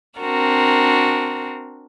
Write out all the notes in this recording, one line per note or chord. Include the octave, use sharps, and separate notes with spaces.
C4 D4 F#4 A#4